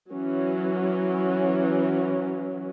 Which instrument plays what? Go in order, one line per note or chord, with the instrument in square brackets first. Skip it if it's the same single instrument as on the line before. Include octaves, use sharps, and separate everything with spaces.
[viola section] E3 F#3 C#4